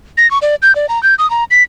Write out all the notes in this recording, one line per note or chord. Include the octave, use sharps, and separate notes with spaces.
A#6
C#6
D5
G6
D5
A#5
G6
D#6
A#5
B6